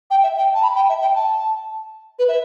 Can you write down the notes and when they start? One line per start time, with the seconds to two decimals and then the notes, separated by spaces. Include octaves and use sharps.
0.10 G5
0.23 E5
0.37 G5
0.54 A5
0.62 B5
0.76 G5
0.89 E5
1.01 G5
1.15 A5
2.19 B4
2.28 E5